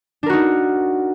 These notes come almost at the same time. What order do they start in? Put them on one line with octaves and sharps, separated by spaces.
D4 A#4 F#4 D#4